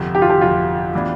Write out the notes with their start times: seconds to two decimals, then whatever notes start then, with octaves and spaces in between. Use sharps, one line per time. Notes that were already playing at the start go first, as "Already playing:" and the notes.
Already playing: G1 F2 C3
0.15 G4
0.22 F4
0.29 G4
0.41 G1 F2 C3 F4
0.95 E3 B3 D4